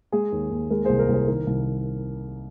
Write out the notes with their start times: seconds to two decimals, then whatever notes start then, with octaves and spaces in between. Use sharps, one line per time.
0.12 G#3 G#4
0.32 D#2
0.51 D#2
0.70 G#3 A#4
0.85 C2 G#4 C5
0.99 A#4
1.09 C2 G#4 C5
1.28 D#3 A#4
1.47 C2